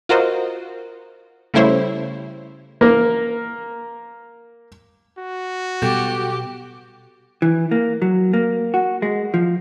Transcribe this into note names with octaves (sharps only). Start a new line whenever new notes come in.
F4 F#4 A#4 C5 D#5
C#3 G3 A3 E4 C5 C#5
A#3 A#4
F#4
B2 G3 G4 A4 G6
E3
A#3
F#3
A#3
F#4
G#3
F3